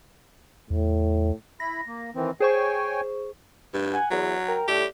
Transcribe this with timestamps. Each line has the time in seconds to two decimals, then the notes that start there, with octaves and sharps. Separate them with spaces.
0.70 E2 A2
1.60 E4 B5 A#6
1.87 A#3
2.15 D#3 E3 C4
2.40 G#4 C5 C#5 G5 G#5 C#6
3.74 G2
3.93 F#5 G#5
4.11 E2 F#3
4.47 A#4 G5 A#5
4.68 A2 G3 A3 G4